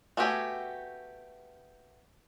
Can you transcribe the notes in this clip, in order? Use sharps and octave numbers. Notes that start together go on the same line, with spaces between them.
A3 B3 F#4 G4 G#5